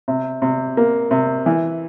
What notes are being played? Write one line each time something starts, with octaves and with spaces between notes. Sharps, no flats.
C3
C3
A#3
C3
E3